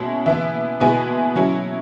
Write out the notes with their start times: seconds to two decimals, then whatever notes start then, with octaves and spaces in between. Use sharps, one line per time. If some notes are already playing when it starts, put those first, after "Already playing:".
Already playing: B2 G#3 C#4 E4
0.26 E3 B3 E4 E5
0.80 B2 G#3 B3 E4 G#5
1.35 F#3 C#4 E4